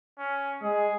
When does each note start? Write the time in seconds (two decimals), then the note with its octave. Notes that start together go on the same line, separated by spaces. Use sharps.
0.19 C#4
0.62 G#3 G#4